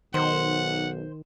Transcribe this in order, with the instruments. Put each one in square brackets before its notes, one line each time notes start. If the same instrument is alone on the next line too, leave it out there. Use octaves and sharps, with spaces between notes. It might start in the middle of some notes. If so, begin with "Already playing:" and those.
[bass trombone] B1 [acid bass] D#3 [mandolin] C5 [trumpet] F#5